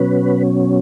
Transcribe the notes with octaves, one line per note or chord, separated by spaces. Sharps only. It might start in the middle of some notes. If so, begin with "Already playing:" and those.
Already playing: B2 F#3 C#4 B4